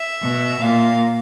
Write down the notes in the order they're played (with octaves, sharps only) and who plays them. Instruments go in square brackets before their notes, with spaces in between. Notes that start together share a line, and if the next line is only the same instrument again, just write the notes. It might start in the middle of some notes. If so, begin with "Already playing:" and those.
Already playing: [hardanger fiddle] E5
[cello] B2
[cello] A#2 [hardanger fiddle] F5